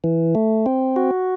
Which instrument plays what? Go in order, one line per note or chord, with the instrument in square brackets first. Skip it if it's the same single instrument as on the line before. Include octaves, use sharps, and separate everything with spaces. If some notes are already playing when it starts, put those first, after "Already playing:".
[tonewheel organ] E3
A3
C4
F#4